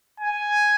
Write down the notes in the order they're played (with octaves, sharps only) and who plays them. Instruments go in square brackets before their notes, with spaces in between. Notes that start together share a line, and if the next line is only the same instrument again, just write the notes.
[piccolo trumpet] G#5